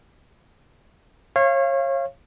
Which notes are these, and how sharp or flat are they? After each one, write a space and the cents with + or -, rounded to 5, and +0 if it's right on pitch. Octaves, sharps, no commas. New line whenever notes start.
C#5 -30 F5 -25